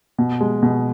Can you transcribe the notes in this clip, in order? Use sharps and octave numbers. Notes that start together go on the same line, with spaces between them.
B2
G#3
B2